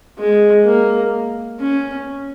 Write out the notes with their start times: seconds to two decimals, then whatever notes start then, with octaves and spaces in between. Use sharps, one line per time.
0.19 G#3
0.66 A#3
1.60 C#4